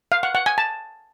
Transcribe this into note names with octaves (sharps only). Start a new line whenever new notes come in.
F5
F#5
F#5
G#5
A5